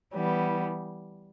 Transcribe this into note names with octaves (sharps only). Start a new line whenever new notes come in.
E3 G3 B3